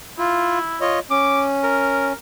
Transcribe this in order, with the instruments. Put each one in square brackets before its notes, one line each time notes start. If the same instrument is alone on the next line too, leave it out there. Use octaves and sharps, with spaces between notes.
[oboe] E4 [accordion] F4
[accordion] F4 C#5 D#5
[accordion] C#4 [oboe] D6
[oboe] A#4